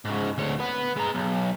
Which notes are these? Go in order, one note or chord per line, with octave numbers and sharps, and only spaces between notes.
G#2 C#3
D2 C#5
B4 F#5
G#3 A#5
B1